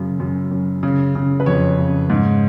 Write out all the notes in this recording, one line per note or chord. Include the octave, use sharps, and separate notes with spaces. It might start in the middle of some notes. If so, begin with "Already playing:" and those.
Already playing: F#2 C#3
F#2
F#2
C#3
C#3
B4
F2 C#5
C#3
G#2